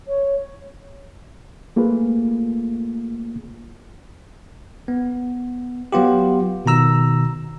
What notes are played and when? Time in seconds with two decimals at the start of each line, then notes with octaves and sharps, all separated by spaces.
0.08 C#5
1.76 A3 A#3 F4 G#4 B4
4.88 B3
5.92 F#3 B3 F4 G4
6.66 B2 D#3 A#5 E6